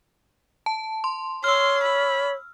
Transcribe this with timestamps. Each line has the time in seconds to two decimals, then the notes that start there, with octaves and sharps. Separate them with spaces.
0.66 A5
1.04 C6
1.44 C#5 C6 E6 F6
1.83 B5